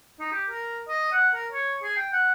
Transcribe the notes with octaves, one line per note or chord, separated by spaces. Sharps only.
D#4
G4
A#4
D#5
F#5
A#4
C#5
G#4
G5
F#5